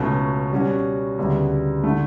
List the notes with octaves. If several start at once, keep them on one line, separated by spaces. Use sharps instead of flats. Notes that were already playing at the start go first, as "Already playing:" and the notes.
Already playing: C#2 B2 F#3 A3 C#4
B2 G3 C#4 F#4
D2 C#3 G3 B3
D3 A3